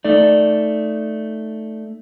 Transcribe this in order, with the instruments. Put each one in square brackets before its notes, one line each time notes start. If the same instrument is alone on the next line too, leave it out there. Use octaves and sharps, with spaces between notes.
[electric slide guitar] A3 D#4 D5